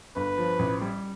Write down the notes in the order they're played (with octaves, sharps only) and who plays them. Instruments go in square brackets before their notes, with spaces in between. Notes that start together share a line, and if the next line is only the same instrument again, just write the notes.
[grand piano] G1 [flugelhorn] B4
[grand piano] F3
A1
G3